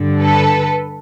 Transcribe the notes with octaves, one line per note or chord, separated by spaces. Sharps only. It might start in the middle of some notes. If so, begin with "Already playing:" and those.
Already playing: G2 D3
A4 B4